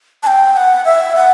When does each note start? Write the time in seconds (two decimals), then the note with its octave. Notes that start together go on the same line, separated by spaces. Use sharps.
0.23 A5
0.27 G5
0.53 G5
0.56 F#5
0.85 E5
1.16 F#5